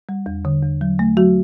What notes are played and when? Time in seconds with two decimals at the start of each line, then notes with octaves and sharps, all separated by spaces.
0.09 G3
0.26 E2
0.45 D3
0.63 E2
0.81 F#3
0.99 A3
1.17 F#3 F#4